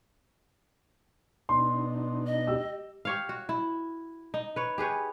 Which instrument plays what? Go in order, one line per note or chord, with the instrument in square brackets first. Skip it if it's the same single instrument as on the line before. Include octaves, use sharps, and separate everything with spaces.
[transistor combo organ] B2 D4 D#4 [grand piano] C6
[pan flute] D#5
[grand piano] G4 E6
[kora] G4 C#5 F5
F#4
E4
D#4
B4 C#5
G4 G#4 B4 C#5